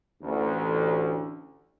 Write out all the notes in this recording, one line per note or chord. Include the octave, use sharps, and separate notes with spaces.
A1 D2